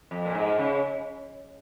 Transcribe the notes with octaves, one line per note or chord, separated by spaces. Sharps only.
F2
A#2
G#2
C#3